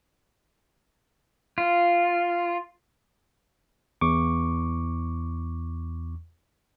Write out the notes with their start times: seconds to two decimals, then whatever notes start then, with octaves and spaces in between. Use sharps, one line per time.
1.58 F4
4.01 E2 C#6 D6